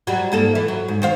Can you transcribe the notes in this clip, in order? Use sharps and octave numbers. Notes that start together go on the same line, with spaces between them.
F#3 G3
G#2 A#3 A4
E3
F#3
G#2
D#3 C5 F5